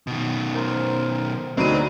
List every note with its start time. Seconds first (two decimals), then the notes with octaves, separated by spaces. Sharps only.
0.07 B2 D#3
0.55 A#4 C5
1.57 D2 F#3 C4 D#4 B4 D5 D#7